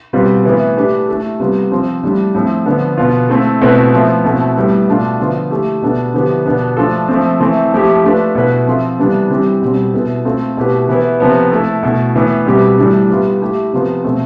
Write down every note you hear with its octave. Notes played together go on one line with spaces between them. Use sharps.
B2 G3 C4 F4 B4
A2 E3 B3 E4 B4
A3 D4 G4 B4
A3 E4 A4
C3 G3 B3 F4
F3 C4 F4
A2 G3 D4
A2 F3 C4
D3 F3 B3
B2 B3 F4
A3 C4 E4 A4
B2 A3 C4 E4 B4
A2 F3 B3 F4
B2 A3 C4 E4
A2 G3 B3
B2 A3 D4 F4
D3 F3 B3 F4
A3 E4 G4
B2 B3 D4 A4
D3 F3 B3 E4 G4
B2 B3 D4
F3 A3 D4 F4 A4
F3 A3 C4
E3 A3 C4
F3 A3 E4 G4
A3 D4 F4 B4
B2 A3 E4 B4
F3 C4 F4 A4
C3 E3 G3 B3 D4
E3 G3 C4 G4
B2 G3 C4
B2 B3 E4 A4
A3 C4 F4 A4
B2 A3 E4 G4 B4
E3 B3 E4 B4
C3 F3 B3
A3 E4 A4
B2 A3 E4 A4
A2 E3 B3
B2 G3 C4 G4 B4
A2 E3 G3 D4
G3 B3 F4
A3 E4 G4
C3 F3 B3 F4
B2 A3 C4